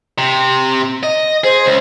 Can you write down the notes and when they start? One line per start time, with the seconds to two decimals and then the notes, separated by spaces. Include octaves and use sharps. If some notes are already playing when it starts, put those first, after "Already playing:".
0.18 C3
1.03 D#5
1.44 G#4 C5
1.66 C#2